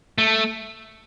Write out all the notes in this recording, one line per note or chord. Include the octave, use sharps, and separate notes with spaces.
A3